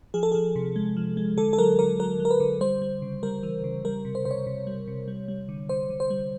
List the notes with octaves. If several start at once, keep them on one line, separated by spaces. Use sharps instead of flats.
F3 G#4
A4
F3 G#4
C3
G#3
F3
G#3
D3 A4
A4
F#3 A#4
D3 A#4
F#3 A#4
F#3
A#4
B4
D3
G3 C5
G3
C#3
G3 A#4
E3
C#3
G3 A#4
C3
C5
C3 C5
C#5
C3
G3
C3
G3
G3
D3
D3 C5
D3
C5
G3